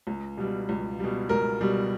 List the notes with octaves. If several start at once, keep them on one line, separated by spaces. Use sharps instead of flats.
C#2
B2 G3
C#2
B2 G3
C#2 A#4
B2 G3